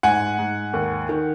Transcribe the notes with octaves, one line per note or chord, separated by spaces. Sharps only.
G#2 F#5 G#5
G#2
D#2
D#3